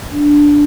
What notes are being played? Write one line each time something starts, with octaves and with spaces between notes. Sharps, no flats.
D4